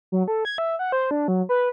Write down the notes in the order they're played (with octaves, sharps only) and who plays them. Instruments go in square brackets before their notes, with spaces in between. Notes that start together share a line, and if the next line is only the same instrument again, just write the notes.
[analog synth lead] F#3
A4
G#6
E5
F#5
C5
D4
F#3
B4